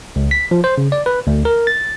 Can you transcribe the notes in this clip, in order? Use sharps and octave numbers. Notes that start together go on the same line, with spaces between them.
C#2
B6
F3
C5
C#3
D5
B4
D2
A#4
A6